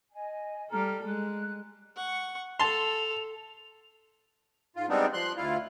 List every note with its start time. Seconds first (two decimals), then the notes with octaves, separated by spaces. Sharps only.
0.12 D#5 G#5
0.70 G3 A4 A#5 F6
1.06 G#3 F#6
1.96 F#5 C#6
2.60 A4 A5 C6 F7
4.76 G#2 F4
4.89 G3 G#3 B3 C4 D4 D#4
5.13 F3 C6 F#6
5.37 D2 E4 F4 F5